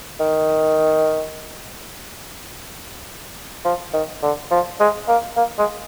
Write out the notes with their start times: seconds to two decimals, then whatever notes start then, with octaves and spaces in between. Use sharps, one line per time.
0.20 D#3
3.65 F3
3.93 D#3
4.23 D3
4.51 F3
4.80 G#3
5.08 A#3
5.37 A#3
5.58 G#3